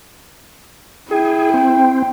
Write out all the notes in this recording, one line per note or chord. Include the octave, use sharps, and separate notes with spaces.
E4 G#4 G5
C4